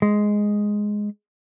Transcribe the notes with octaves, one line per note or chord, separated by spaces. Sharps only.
G#3